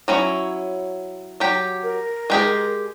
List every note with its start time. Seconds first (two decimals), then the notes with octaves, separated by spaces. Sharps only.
0.08 F#3 C#4 E4
1.40 F#3 G4
1.83 A#4
2.30 G#3 G4 G#4